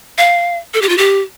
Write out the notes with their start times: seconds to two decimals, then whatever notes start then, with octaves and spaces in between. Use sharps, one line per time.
0.18 F5
0.74 A4
0.82 G4
0.89 F4
0.98 G4